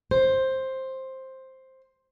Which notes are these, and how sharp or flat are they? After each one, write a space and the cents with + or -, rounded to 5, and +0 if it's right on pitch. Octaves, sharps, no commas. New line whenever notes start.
C5 +10